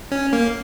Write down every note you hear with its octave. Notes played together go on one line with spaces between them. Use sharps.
C#4
A#3